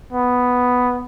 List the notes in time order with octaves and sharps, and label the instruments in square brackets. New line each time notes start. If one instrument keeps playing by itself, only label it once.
[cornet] B3